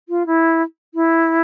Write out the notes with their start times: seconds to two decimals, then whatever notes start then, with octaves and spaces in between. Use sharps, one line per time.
0.09 F4
0.26 E4
0.94 E4